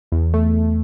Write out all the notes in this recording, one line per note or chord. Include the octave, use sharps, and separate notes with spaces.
E2
A3